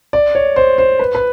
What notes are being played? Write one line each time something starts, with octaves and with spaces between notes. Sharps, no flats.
D5
C#5
C5
C5
B4
B4